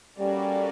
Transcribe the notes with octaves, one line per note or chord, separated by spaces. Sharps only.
G3 A#3 C#4 F#4 A4 D5